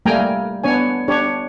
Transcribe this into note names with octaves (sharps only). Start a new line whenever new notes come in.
G3 A3 A#3 G5 G#5 A#5
B3 D4 C#5 G#5
D4 G4 C#5